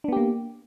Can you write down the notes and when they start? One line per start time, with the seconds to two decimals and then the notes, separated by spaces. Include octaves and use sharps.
0.04 D4
0.08 B3
0.12 G4
0.17 A#3